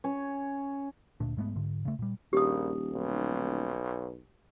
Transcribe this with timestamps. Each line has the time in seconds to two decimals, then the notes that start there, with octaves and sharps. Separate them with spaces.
0.04 C#4 C#5
1.20 D2 A#2 D4
1.37 G#2 G#3 A3 B3
1.56 G#2 D3
1.85 C#3 A3
1.99 A#2 G3
2.33 D#1 A#1 G4 D#6
2.93 B1